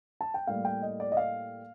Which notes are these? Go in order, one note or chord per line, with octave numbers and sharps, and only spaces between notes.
A5
G5
A2 G3 A#3 F5
G5
D#5
D5
D#5
F5